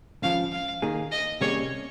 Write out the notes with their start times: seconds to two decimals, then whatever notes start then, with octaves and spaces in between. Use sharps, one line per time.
0.22 C#2 C#3 F3 F5
0.52 F5
0.82 D#3 A#3 D#4 G#4
1.12 D#5
1.41 C3 G3 A#3 C#4 G#4 C#5